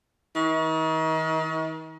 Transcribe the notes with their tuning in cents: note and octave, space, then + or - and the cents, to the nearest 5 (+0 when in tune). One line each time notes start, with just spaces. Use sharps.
D#3 +40